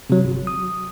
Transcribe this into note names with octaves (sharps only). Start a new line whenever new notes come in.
C3 F#3
G1
D#6